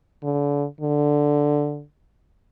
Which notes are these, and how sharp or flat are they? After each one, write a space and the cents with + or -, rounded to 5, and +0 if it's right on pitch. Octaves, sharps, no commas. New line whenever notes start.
D3 -35
D3 +0